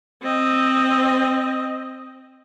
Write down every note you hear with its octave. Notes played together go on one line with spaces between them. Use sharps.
C4 D#5